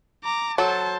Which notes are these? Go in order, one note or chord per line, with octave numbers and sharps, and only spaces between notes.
A#5 D6
F#3 A4 C5 A5